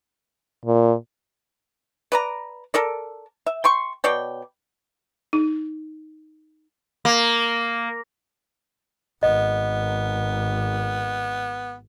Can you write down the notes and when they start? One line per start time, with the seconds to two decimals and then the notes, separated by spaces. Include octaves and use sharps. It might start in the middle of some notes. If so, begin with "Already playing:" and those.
0.65 A#2
2.12 B4 D5 A#5
2.74 A4 A#4 D5
3.46 E5
3.64 G5 C6 C#6
4.04 B2 C#5 D5 G5
5.33 D#4
7.05 A#3
9.23 G#1 B3 D#5